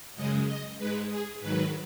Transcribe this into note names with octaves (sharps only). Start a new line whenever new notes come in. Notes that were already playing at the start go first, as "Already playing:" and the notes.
F#2 C#3 G#3 D#5
D#5
G#2 G#3 B4
G#4
G#2 D#3 F#3 B4